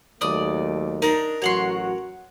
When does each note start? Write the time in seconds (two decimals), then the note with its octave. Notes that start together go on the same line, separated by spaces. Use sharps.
0.21 D#2 F#3 A3 D5 D#6
1.02 D4 D#4 A#4
1.42 A1 F#3 F#4 C#5 F#5 C6